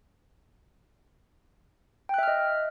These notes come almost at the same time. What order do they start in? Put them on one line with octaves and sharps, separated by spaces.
G5 F#6 E5 F6 D#5